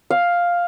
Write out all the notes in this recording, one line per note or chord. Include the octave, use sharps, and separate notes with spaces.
F5